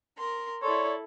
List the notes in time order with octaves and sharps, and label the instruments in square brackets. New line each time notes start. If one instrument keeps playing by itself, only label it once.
[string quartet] A#4 C6
[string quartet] E4 A4 [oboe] C#5 [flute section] D5 C6